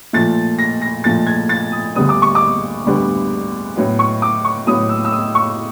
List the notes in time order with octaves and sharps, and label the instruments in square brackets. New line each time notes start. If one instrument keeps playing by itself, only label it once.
[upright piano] A#2 F3 A3 A6
A#6
A#6
A#2 F3 A3 A6
G#6
A6
D#6
D2 D3 G3 B3 D#6
D6
C#6
D6
D2 D3 G3 B3
A2 F#3 B3
C#6
D6
C#6
A2 F#3 B3 D#6
E6
E6
D#6
C#6